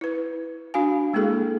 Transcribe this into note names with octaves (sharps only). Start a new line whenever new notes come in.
E4 B4
D4 F#4 F5 G#5
G#3 A#3 E4 G#4 A4